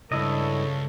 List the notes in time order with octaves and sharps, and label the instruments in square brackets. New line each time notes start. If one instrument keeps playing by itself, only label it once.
[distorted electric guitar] C#2 [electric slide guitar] G2 E4 D#5 [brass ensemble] A4 C#5